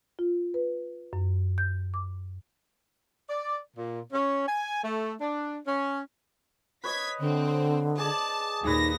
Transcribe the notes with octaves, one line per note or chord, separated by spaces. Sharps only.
F4
B4
F#2
G6
D6
D5
A#2
C#4
G#5
A3
D4
C#4
B4 C#5 D#5 G#6 B6
D3 C4
G#4 D5 D#5 A5
D#2 A#2 D#4 G#4 B4 A#6